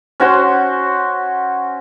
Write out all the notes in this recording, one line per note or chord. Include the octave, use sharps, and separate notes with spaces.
C#4 F#4 C5 C6